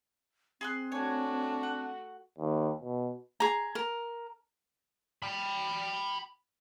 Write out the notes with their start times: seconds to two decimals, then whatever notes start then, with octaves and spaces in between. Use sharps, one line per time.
0.61 C4 G#4 C6 F#6
0.92 A3 D4 F#4 C#5 G#5
1.63 F#5
2.39 D#2
2.82 B2
3.40 G#4 A#5
3.75 A#4
5.23 G5 B5